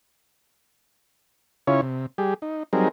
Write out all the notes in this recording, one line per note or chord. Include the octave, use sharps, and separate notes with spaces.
C#3 C#4 E4 F4 C#5
C3
G3 G4 G#4
D#4
F#3 G3 C4 D#4 G#4 A#4